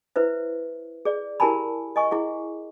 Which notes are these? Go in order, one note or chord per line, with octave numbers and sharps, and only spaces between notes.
E4 B4 C5 E5
G#4 D5
E4 G4 A#4 G#5 A5 B5
D#5 G#5 C#6
E4 G#4 F#5